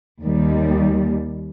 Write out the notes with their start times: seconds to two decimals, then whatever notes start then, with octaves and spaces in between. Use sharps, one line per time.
0.22 D#2 D#3 G3